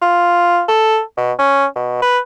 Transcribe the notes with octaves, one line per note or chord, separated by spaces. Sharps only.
F4
A4
B2
C#4
B2
B4